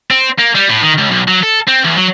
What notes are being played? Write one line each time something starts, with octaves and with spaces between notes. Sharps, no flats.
C4
A#3
G3
A2
D#3
C#2
B1
F#3
A4
C4
E2
F#3